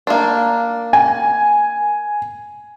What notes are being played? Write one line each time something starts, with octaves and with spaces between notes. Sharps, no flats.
A#3 D4
G#5